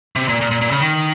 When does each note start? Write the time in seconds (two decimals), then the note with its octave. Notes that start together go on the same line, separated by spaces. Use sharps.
0.16 C3
0.28 A#2
0.41 A#2
0.51 A#2
0.61 A#2
0.71 C#3
0.80 D#3